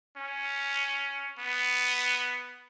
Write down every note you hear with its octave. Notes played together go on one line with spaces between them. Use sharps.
C#4
B3